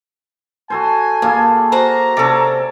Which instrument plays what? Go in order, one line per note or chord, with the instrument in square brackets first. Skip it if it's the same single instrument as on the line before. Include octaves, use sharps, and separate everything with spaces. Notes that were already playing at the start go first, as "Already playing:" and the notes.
[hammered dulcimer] F#4 A4 C5 [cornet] G#5
[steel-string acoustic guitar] G2 [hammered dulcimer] A#3 G#4 A4
[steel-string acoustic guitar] F#4 C5 F#5 [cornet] A#5
[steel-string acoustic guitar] C3 C4 [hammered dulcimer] C#4 A4 D5